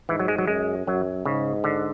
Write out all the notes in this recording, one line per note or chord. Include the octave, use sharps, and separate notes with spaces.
G#2 E3
F#3
G#3
F#3
F#2 G#3
F#2 F#3
G#2 C#3
D3